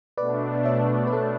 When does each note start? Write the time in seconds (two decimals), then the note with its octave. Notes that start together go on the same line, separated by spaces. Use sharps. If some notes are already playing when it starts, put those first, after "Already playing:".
0.17 B2 A3 D4 B4 D5
0.65 C#5 E5
1.07 B4
1.13 A4